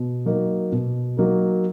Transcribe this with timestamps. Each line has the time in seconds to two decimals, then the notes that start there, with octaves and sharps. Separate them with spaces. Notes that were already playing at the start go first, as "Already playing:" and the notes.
Already playing: B2
0.26 F#3 A#3 D#4 A#4
0.72 B2
1.17 F#3 A#3 D#4 A#4